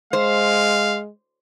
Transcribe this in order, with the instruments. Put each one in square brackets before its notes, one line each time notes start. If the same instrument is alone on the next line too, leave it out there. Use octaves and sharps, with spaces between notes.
[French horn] G#3 [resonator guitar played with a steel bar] C5 [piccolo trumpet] F5